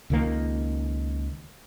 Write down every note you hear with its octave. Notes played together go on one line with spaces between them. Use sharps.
C#2 D#3 A#3